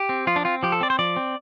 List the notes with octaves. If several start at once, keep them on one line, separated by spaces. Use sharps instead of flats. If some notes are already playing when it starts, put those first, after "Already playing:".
Already playing: G4
C4
F3 F4
D4
C4 F4
F3 G4
A4
C4 D5
C5
F3 D5
C4